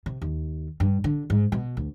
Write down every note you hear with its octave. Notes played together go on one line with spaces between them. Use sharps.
C3
D#2
G2
D3
G#2
B2
D2